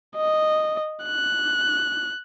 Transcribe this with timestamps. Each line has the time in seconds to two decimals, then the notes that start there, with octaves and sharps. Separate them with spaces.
0.15 D#5
1.04 F#6